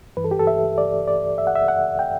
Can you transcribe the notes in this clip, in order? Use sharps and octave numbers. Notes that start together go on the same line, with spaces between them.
G2 E3 B4
A4
G4
A4
E5
D5
D5
E5
F#5
E5
F#5
G5